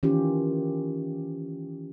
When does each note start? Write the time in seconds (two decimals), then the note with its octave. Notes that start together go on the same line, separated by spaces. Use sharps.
0.03 D#3 E3 C#4 F4 G4